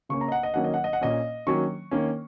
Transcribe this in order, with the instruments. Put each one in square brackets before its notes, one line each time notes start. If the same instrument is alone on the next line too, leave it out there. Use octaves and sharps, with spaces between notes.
[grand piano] C#3 A#3 C#4 C#6
A#5
D#5
F#5
D#5
D#3 F#3 A#3 C#4 F#5
D#5
F#5
D#5
F#5
A#2 A#3 C#4 D#5
D#3 F#3 A#3 C#4 C#6
D#3 A#3 C#4